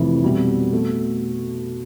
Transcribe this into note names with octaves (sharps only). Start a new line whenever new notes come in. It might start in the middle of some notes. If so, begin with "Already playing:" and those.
Already playing: F1 F2 E3
B2 G3 C4
B2 A3